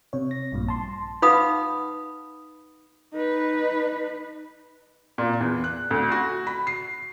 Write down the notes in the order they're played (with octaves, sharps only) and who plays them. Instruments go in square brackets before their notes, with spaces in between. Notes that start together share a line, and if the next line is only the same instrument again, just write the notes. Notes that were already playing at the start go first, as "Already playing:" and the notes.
[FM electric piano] C3 C#5
A#6
A#1 G2 A#2
A5 C6
[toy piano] D#4 B4 F5 F#5 B5 D#6
[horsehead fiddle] D#4 B4
[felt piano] A#2
E2
F#6
D2
F#4
B5
C7